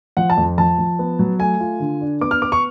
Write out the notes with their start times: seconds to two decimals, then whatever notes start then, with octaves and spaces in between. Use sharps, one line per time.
0.17 F3 F#5
0.30 A5
0.37 F2
0.58 F3 A5
0.78 F3
0.99 B3
1.19 F#3
1.39 A3 G#5
1.60 F4
1.80 D3
2.01 D4
2.21 B3 D6
2.31 F6
2.42 B3 D6
2.52 C#6